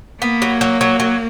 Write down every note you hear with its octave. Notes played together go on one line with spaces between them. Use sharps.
A#3 B3
F#3
F#3
F#3
F#3